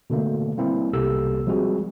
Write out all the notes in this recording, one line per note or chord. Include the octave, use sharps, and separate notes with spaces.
B2 D3 A3 A#3
G3 A#3 C4 E4
C2 B2 A#3 G4 A4 E6
F3 G3 G#3 C4 F#4 G#4